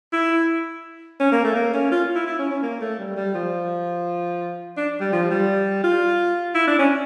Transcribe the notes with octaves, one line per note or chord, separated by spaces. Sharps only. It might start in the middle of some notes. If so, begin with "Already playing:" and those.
E4
C#4
A#3
A3
A#3
C#4
F4
E4
E4
C#4
C#4
A#3
A3
G3
G3
F3
D4
G3
F3
G3
F4
E4
D4
C#4